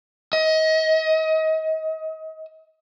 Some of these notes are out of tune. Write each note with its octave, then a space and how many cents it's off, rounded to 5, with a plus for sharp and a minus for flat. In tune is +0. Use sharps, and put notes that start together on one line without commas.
D#5 +30